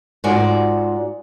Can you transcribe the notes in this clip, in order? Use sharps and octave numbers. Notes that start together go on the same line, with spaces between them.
G#2 F4 F#4 D5 G#5